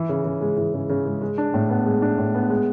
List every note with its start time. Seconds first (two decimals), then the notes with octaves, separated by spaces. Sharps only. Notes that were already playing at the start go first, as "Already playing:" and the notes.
Already playing: E3
0.09 C#3
0.25 C#3
0.41 G#3
0.57 E3
0.74 C#3
0.89 C#3
1.05 G#3
1.22 G#3
1.38 D4
1.54 A2
1.70 B3
1.86 G#3
2.02 D4
2.18 A2
2.35 B3
2.50 G#3